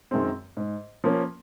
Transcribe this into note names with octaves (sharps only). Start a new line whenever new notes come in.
F#2 D#3 G#3 C4
G#2
F3 A#3 C#4